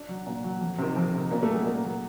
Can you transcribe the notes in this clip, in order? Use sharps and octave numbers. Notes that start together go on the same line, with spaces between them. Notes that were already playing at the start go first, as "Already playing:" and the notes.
Already playing: D4
F#3
A#2
F#3
F2
C3 D#3
F2
C3 D#3
A#2 A#3
A3
F#3 G#3
A#2 A#3
F#3